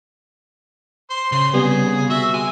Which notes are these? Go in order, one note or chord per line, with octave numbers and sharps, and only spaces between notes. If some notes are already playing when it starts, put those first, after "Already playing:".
C5 C6
C#3 C5 C6
C3 G3 B3 G#4
F#4 E5
G#3 G#5